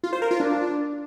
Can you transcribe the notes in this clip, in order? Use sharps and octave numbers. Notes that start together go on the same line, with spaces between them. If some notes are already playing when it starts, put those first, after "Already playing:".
F4
C5
A#4
F4
D4